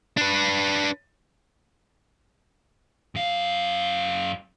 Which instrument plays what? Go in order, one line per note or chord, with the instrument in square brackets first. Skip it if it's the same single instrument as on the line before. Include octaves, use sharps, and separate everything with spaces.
[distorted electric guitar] D4 B4
[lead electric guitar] F#2 F5